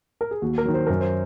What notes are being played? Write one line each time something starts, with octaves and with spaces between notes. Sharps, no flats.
A#4
G#4
D#2 F#4
A#4
D#3 F#3
C5
F#2 A#4
C5